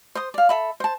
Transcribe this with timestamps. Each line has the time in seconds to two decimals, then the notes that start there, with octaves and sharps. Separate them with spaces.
0.15 C5 C6 D#6
0.34 D5 F5
0.49 A4 E5 B5
0.80 C5 A5